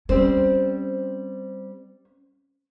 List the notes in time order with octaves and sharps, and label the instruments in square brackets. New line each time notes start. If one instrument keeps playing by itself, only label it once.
[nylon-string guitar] G3 C4 C5 [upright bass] C#4